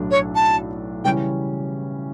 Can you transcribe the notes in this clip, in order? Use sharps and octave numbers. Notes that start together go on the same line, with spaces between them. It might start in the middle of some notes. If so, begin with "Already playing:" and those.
Already playing: B1 A2 F#3 A3 D4
C#5
A5
C#3 E3 G3 C#4 G5